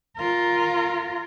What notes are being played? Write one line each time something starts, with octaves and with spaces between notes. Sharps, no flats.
F4 A#4